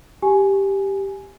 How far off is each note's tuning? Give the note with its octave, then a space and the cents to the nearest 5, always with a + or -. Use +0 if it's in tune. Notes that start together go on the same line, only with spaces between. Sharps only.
G4 +0 G#5 +10